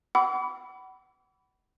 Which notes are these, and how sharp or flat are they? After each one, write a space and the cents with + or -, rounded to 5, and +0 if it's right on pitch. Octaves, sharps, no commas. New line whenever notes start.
F#5 +35 B5 +0 D6 -40